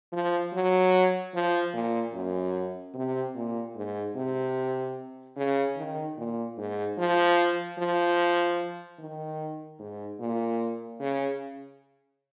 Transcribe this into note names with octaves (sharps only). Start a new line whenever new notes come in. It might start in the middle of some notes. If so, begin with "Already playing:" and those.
F3
F#3
F3
A#2
F#2
C3
A#2
G#2
C3
C#3
D#3
A#2
G#2
F3
F3
D#3
G#2
A#2
C#3